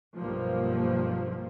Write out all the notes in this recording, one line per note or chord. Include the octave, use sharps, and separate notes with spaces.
B1 G2 F3 A#3